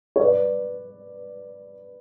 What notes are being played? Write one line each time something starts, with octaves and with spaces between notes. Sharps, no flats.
C#5
B4 D5